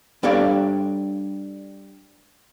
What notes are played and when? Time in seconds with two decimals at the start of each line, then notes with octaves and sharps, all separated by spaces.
0.23 G3 D4 A4 C#5 D5 F5